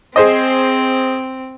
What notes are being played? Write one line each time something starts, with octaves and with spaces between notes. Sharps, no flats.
C4 G#4 C5 D#5